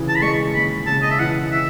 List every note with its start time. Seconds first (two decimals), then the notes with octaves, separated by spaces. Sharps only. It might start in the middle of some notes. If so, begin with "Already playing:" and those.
Already playing: C#3 E3
0.08 A5
0.16 B5
0.22 G#3 C#6
0.54 D#2 B5
0.86 C#3 A5
1.02 D#5
1.11 E5
1.19 E3 F#5
1.51 E5